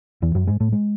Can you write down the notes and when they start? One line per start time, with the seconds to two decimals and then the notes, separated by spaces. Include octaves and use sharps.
0.22 E2 E3
0.35 F#2 F#3
0.47 G#2 G#3
0.60 A2 A3
0.72 G#3